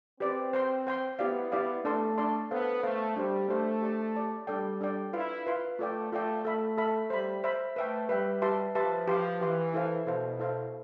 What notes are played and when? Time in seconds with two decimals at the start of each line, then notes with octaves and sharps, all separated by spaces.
0.20 C4 G4 B4 D5
0.53 C5 G5 C6
0.87 C5 G5 C6
1.19 B3 E4 G4 D5 F5
1.52 E4 G4 D5 F5
1.85 A3 D4 A4 D5 A5 C6
2.18 D4 A4 D5 A5 C6
2.50 B3 A4 C5 F5
2.83 A3 A4 C5 F5
3.16 G3 D4 G4 C5
3.49 A3 D4 G4 C5
3.82 G4 D5 A5
4.15 G4 D5 A5
4.47 G3 D4 A4 D5 G5
4.81 D4 A4 D5 G5
5.13 E4 F4 B4 F5 C6
5.47 F4 B4 F5 C6
5.79 A3 F4 A4 D5 G5
6.12 A3 F4 A4 D5 G5
6.45 A3 A4 E5 B5
6.78 A4 E5 B5
7.10 G3 C5 E5 B5
7.44 C5 E5 B5
7.76 A3 B4 E5 G5
8.09 G3 B4 E5 G5
8.42 G4 B4 E5 A5 C6
8.75 F3 G4 B4 E5 A5 C6
9.08 F3 G4 B4 F5 C6
9.41 E3 G4 B4 F5 C6
9.74 E4 A4 C5 F5
10.06 B2 E4 A4 C5 F5
10.39 E4 A4 C5 F5